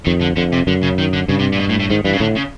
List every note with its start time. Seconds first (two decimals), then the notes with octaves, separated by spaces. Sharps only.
0.06 F2 D#3
0.22 D3
0.37 F2 D3
0.52 C3
0.67 F#2 D3
0.83 C#3
0.98 D#3
1.13 D3
1.28 G2 C#3
1.39 C3
1.52 A#2
1.59 B2
1.69 A2
1.80 A2
1.90 G#2 D#3
2.05 G2 E3
2.13 C#3
2.20 A2 D3
2.36 C#3